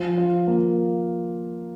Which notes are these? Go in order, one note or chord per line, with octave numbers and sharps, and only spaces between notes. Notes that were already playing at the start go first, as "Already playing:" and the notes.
Already playing: F3
F4
A#3